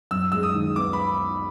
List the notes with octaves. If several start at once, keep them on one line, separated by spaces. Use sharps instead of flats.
F#2 E6
G#3 E6
D#6
D#3
B3 D6
B5